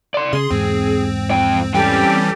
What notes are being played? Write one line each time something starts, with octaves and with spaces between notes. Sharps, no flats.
D5 C6
C#3 G#4 C6
E2 G#2 C4
F2 G5
E3 G3 C4 C#4 G4 A4 G5